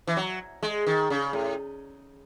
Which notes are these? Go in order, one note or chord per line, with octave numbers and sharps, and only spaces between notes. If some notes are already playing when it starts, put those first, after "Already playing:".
E3
F#3
G#3
D#3
C#3
A2